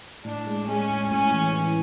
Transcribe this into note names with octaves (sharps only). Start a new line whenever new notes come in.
A2 D4
G#3
G#3 C#4
A2
A2 C#4
E3
E3